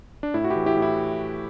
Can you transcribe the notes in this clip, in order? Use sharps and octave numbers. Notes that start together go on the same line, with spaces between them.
D4
A2 E4
F#4
E4 G4
E3
E4 G4
A2
E4